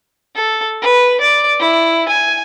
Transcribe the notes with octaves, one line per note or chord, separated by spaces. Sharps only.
A4
B4
D5
E4
G#5